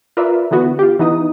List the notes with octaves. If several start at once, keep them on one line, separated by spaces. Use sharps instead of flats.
F4 A#4 B4 D5 E5
D3 E3 B3 F#4 B4
F4 G4
E3 B3 D#4 D#6